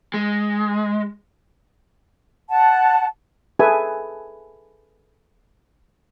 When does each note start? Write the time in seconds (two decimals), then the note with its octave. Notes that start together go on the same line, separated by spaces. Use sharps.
0.14 G#3
2.49 F#5 A5
3.59 G#4 A4 B4 E5 G#5